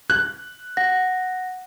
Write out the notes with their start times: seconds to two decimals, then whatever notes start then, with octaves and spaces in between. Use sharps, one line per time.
0.10 F#6
0.77 F#5 A#6